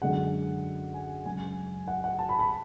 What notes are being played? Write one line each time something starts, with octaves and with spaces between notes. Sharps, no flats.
F#2 D3 G#3 F#5
G#5
F#2 C#3 G#3 G#5
F#5
F#5
A5
B5
B5